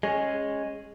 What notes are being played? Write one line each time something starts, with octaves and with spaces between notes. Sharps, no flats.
G#3 C#4